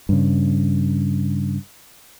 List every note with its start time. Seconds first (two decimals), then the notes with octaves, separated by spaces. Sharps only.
0.09 G2 C#3